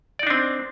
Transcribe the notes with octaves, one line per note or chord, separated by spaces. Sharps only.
C4 D4 D#4 D5